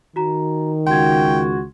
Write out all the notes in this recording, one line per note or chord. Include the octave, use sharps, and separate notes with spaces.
D#3 F#4 A#5
C#2 F#4 G5 C6 G#6